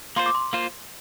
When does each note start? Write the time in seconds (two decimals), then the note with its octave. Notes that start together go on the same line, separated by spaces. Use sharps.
0.16 A#3 F4 C5 C6
0.26 D6
0.35 C6
0.53 A#3 F4 C5